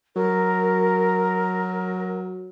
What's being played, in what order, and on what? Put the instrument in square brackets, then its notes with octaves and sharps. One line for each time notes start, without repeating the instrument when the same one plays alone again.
[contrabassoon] F#3 [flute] A#4